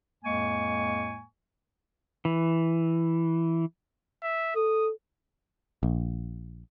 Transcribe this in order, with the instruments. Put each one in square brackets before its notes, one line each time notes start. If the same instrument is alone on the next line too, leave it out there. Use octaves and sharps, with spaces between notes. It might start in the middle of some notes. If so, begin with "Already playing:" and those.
[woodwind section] F2 A2 G#3 A#3 G#5 C#6
[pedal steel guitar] E3
[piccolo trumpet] E5
[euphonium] A4 [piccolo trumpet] D#6
[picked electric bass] A#1